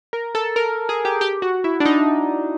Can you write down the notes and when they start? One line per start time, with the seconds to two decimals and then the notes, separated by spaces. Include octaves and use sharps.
0.13 A#4
0.35 A4
0.56 A#4
0.89 G#4
1.05 G4
1.21 G4
1.42 F#4
1.64 E4
1.80 D4
1.85 D#4